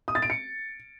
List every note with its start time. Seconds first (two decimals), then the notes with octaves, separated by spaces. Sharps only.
0.08 D#6
0.15 A6
0.22 D7
0.30 C#7